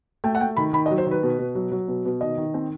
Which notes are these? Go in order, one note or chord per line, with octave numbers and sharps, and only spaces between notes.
A3 G5
F#5
A3 G5
D#3 B5
D#3 B5
D#5
F#3
C5
D#3 B4
B2
B2
F#3
F#3
B2
B2
D#3 D#5
D#3
C4